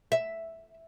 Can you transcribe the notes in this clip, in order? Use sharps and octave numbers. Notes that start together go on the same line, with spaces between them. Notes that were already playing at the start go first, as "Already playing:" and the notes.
E5